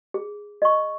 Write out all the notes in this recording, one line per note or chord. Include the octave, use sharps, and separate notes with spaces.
G#4
D#5 C#6